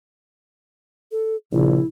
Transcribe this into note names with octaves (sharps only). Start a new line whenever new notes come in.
A4
A#1 C#3 E4